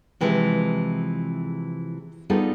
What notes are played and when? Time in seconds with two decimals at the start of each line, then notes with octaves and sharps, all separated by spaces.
0.21 C3 E3 F3 G#3 E4
2.30 G3 B3 D#4 F4 G#4 A4